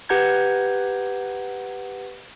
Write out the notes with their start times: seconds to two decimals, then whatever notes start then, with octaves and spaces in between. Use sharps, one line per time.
0.09 G4 B4 F#5 A#5 G6 G#6